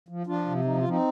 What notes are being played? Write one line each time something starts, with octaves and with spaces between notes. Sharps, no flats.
F3
F3 D4 F4
C3
F3 D#4
F4
F3
C4 D#4